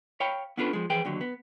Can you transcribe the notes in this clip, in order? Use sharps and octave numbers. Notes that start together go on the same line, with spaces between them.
C#5 F5 G5 B5
B3 C#4 D4 F4 A4 B4
F3 G#3
F2 E3 G#4 B4 G5
D#2 D3 F#3
B3